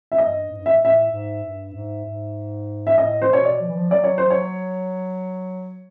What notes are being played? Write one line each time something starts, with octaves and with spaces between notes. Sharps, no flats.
E5
G2 D#5
G#2
G2
G#2 E5
A2 E5
G#2
G2
G#2
G#2
E5
A2 D#5
C5
B2 C#5
D5
F3
E3
F3
F#3 D5
C#5
C5
C#5